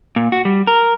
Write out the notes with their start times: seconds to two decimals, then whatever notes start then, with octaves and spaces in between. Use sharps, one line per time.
0.16 A#2
0.32 F#4
0.45 G3
0.67 A#4